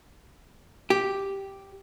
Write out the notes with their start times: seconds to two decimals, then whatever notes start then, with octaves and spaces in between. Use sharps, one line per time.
0.90 G4